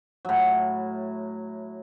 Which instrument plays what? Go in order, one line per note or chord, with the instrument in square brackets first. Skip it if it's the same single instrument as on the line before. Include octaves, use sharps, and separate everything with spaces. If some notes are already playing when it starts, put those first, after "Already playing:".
[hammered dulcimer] A2 F#3